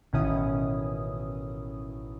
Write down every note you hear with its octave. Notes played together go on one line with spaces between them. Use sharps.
A1 B2 D#3 C#4 E4 D#6